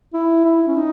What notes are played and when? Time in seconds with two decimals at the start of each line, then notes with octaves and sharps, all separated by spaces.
0.14 E4
0.44 E4
0.67 C#4
0.76 D#4